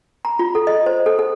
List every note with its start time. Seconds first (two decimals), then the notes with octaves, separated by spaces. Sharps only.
0.25 A#5
0.39 F4
0.55 A4
0.67 D#5
0.86 C5
1.06 A4
1.19 A4